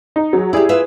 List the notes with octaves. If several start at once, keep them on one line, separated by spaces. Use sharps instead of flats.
D#4
F#3 G#4
E4 G4 G#4 D5
F4 B4 E5